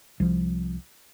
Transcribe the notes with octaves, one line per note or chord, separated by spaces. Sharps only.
C2 F3